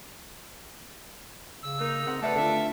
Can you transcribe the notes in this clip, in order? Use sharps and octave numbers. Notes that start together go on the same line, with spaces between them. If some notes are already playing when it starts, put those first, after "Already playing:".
C#3 E6
A#3 D#4
C4 F#5
A3 D4 A4 B4 E5 A5
D3 F4 E5